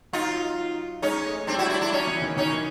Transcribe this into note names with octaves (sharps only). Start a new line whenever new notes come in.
F#3 D#4 F4
G#3 C#4 D#4
A3
G3 C4 D4
E4 F#4
D4 E4
D4 E4
F#3 C#4 D#4
E3
D#3
D#3 C#4 D#4